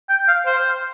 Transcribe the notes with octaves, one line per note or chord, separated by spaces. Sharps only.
G5
F5
C5